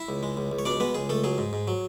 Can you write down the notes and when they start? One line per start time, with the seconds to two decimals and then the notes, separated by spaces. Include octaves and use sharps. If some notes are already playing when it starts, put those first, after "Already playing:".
Already playing: E4 E5
0.09 C#2
0.23 G#3
0.37 C#2
0.52 C#2
0.59 C#5
0.65 B2 D4 D5
0.80 G#3 B3 B4
0.95 C#2 G#4
1.09 C#2 A3 A4
1.24 F#3 G#4
1.38 G#2
1.53 G#2
1.68 F#3